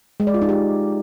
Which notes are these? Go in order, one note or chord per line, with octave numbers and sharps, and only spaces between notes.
G#3
D5
F4
D#4
G4